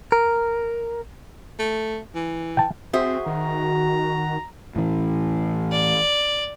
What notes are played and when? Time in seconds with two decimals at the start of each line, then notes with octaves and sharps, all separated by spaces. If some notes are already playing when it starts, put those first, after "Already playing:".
0.12 A#4
1.59 A3
2.15 E3
2.57 G5 A5
2.93 C4 F#4 G#4 C5 E5
3.26 D#3 A#5
4.76 A2 E3
5.72 D5